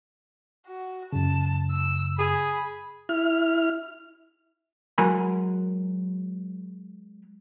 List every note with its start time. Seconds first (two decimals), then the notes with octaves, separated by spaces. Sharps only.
0.67 F#4
1.13 F#2 C#3 A5
1.71 E6
2.19 G#4 B5
3.09 E4 F6
4.98 F#3 G#3 A#4 F#5 G#5 B5